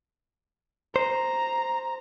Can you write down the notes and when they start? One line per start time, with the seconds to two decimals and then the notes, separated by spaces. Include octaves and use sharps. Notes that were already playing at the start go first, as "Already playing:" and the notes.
0.96 C5 A#5